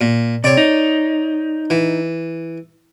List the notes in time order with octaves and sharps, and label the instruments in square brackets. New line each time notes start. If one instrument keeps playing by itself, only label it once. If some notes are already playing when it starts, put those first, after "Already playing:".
[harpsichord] A#2
[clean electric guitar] C3 [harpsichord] C#5 D5
[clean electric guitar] D#4
[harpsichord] E3